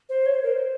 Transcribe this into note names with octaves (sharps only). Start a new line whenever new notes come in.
C5
C#5
C5
A#4
C5